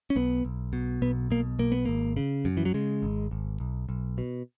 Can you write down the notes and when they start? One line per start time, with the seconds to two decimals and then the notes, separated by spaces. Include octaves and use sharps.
0.10 C#4
0.16 B1 B3
0.45 B1
0.73 B2
1.02 B1 B3
1.31 B2 A#3
1.59 B1 A#3
1.72 B3
1.85 G#1 A#3
2.17 C#3
2.45 F#2
2.57 E3
2.65 F#3
2.74 C#3 G#3
3.03 G#1
3.31 G#1
3.60 B1
3.89 B1
4.18 B2